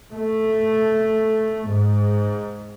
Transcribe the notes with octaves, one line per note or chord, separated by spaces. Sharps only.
A3
G#2